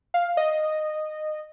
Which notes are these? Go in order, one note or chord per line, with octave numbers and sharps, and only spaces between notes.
F5
D#5